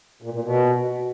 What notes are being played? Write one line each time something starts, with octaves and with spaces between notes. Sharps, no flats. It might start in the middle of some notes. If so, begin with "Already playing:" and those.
A#2
A#2
B2